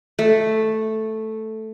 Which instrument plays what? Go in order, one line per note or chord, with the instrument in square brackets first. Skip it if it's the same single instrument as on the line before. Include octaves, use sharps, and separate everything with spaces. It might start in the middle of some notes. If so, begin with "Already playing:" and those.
[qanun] A3